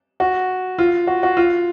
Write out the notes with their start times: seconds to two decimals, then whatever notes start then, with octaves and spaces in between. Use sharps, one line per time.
0.20 F#4
0.78 F4
1.07 F#4
1.23 F#4
1.37 F4